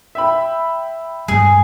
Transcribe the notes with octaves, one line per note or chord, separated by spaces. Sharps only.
E5 G5 B5
G2 G3 G#4